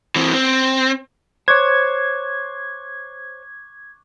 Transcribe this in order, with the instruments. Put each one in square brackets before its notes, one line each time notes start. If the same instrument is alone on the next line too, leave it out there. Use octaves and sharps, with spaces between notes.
[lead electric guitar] E3 C4
C4
[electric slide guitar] C5 C#5 [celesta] C#6 D6 F#6 [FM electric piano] G#6